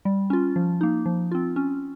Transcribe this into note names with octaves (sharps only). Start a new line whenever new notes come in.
G3
C#4 F4
F3
A#3 D#4
F3
C4 F4
C#4